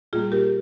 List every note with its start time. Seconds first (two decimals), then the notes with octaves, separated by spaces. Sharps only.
0.13 A#2 G3 A#3 F4 G#4
0.32 G4 A#4